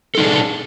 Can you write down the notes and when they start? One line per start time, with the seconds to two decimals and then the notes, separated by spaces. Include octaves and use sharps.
0.15 A4
0.17 D#4
0.20 D4
0.23 G#4